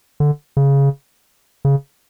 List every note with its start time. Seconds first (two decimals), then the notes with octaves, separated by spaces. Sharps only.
0.20 D3
0.57 C#3
1.65 C#3